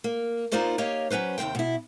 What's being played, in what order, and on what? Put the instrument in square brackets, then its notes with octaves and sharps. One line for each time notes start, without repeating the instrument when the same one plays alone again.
[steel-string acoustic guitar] A#3
A#3 D#4 F4 C5 D5 D#5
A#3 G4 C#5 D#5 F5
F#3 C#4 B4 C5
D#2 C3 A#3 C5 G5
B2 E4